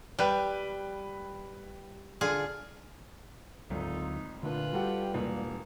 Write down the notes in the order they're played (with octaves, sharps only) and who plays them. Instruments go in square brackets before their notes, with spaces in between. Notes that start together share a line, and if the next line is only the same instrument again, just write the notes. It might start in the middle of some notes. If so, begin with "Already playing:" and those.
[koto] G3 [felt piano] B4 G5
[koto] D3 F4 G#4
[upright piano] G#1 [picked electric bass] D2 F#3 [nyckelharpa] D#4 [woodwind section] F4 A4
[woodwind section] A#2 [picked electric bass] D3 A3 D4 [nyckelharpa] F4 B4
[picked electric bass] G3 [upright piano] F#4 A4 F#5 [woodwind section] G4 G5
[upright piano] E1 [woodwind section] A#3